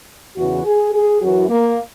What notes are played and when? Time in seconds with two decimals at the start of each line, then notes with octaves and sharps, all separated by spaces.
0.36 E2 C#3 E3 F#4
0.64 G#4
0.92 G#4
1.20 F#2 E3 F#4
1.49 A#3